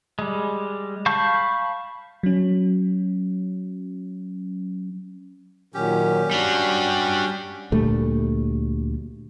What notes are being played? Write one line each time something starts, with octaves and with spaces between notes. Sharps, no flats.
G3 G#3
F5 A5 B5 C#6 G6
F#3 C#4
A#2 D#3 F#3 C#4 G4
G3 D4 F#4
D2 A#2 G3 A3